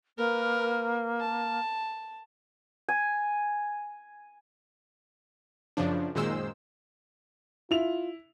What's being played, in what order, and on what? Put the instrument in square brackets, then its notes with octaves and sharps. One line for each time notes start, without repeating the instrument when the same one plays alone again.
[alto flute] A#3 [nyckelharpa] A#4 B4
[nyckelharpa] A5
[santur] G#5
[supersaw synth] F#2 C#3 F3 D4
F#2 A#2 D#3 G#3 C5 E6
[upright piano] E4 F7 [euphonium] F4